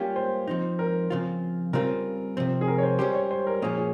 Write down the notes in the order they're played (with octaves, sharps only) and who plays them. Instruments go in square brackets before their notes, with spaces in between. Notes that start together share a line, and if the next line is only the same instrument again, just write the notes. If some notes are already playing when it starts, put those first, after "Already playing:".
Already playing: [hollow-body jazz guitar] G3 A#3 C#4 F4 [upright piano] G4
[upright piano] C5
[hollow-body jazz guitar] F3 C4 D#4
[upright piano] A#4
[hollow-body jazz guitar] C#3 F3 C4 F4
[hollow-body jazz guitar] C#3 G3 C4 F4 [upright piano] A#4
[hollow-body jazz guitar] C3 F3 C4
[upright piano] G#4
A#4
C#5
C5
[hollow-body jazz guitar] G3 C#4 G4 [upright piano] C5
[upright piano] C#5
C5
A#4
[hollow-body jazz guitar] A#2 F3 A#3 C#4 [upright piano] G#4
[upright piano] G#4